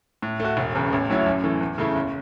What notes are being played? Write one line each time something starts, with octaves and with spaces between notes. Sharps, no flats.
A2
A3 F#4
E1
E2 C#3
A1
A2 F#3 C#4 E4
F#2
E3 A3
E2
C#3 A3 E4
F#1